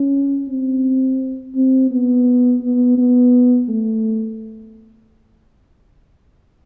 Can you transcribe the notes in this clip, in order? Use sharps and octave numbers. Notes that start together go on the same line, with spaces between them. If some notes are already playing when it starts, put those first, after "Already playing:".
Already playing: C#4
C4
C4
B3
B3
B3
A3